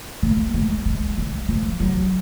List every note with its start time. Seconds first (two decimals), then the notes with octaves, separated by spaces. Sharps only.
0.23 A#3
0.54 G#3
0.85 G#3
1.18 G#3
1.48 F3
1.80 F#3